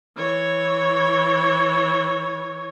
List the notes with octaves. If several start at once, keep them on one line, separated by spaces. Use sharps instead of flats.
E3 C#5